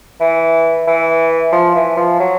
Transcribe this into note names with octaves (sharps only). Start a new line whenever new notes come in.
E3
E3
F3
E3
F3
F#3